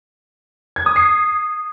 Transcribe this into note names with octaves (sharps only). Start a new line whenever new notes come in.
G#6
D#6
C7